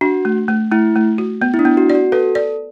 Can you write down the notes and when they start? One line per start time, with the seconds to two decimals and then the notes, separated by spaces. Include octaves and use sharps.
0.01 D4 F#4
0.25 A3
0.48 A3
0.71 A3 E4
0.96 A3
1.18 F#4
1.42 B3
1.54 E4
1.59 D4
1.65 B3
1.77 F#4
1.90 D5
1.95 F#4
2.12 A4 B4
2.35 D5